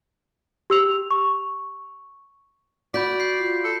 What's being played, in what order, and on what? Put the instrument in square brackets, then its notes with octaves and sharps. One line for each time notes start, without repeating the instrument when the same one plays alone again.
[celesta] G4 E6 F7
C#6
[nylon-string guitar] F#4 [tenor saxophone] D5 [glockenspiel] B5 G6 B6
[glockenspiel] G6 C7
[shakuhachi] F4
[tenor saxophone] A4